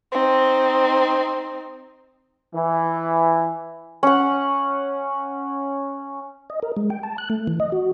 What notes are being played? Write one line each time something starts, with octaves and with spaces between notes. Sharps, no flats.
C4 D#4
E3
C#4 F#5
D#5
A#4
G#3
G5
A5
F#6
A3
E3
D#5
F#4